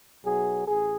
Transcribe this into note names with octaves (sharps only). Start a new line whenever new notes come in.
B1 B2 F#3 G#4
A1 G#4